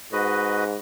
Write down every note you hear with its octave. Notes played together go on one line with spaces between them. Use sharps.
G#2 F#4 B4 D#5